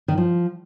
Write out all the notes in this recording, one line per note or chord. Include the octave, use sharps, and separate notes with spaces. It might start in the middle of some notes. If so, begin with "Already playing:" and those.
D#3
F3